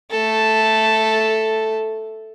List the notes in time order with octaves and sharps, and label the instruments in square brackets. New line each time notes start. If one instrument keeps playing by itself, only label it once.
[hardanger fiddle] A3 A4